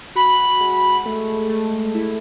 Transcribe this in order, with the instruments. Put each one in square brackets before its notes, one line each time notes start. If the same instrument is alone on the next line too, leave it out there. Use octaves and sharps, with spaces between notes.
[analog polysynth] F#4 [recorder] B5
[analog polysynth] G#3
A3
A3
E4